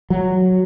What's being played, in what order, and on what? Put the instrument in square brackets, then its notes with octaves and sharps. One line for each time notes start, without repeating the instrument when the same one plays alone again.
[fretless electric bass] F#3